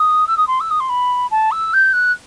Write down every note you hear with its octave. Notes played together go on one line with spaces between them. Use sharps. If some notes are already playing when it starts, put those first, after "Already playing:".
Already playing: D#6
E6
D#6
C6
E6
D#6
C6
B5
A5
E6
G6
F#6